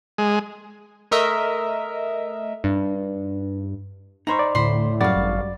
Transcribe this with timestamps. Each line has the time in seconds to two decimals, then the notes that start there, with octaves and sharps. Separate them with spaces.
0.18 G#3
1.11 A3 A#4 D#5 E5
2.64 G2
4.27 D#4 C5 A#5 B5 C#6
4.39 D5
4.55 D2 A2 C5 B5 C6
5.01 F#2 G3 F#4 D5 F5 A6
5.16 G#1